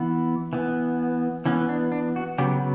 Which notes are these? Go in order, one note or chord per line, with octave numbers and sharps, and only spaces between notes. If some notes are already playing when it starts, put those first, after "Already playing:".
Already playing: E3 B3
E3 B3
E3 B3 C#4
D4
D4
F#4
C#3 F#3 B3 G4